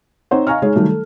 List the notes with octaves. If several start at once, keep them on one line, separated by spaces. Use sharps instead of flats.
C4 D#4 C5 C#5 F#5
D#5 F5 G#5 A#5 C#6 F6
G#3 D#4 G#4 C#5
D#3 F#3 G3 A3
A4